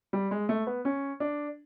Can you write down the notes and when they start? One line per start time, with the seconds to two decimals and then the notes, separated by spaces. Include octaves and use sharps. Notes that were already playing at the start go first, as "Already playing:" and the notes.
0.13 G3
0.31 G#3
0.49 A3
0.67 B3
0.85 C#4
1.20 D4